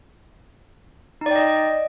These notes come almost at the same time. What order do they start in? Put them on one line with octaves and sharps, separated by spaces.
D#4 D5 G5 D#5